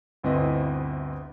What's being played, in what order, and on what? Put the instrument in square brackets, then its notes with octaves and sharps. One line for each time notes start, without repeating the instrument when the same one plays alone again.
[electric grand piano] G1 D2 C4 E4 B4 D#5